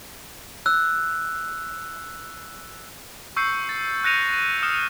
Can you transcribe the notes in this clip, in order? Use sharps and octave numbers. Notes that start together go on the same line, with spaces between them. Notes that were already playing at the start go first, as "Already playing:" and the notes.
E6 F#6
C#6 E6 G6 C7 C#7
A6
F#6 G6 A#6 C#7 D#7 F7
D#6 F6 C#7 E7 F7